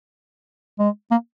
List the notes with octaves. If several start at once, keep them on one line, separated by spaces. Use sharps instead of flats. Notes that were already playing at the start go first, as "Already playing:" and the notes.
G#3
A#3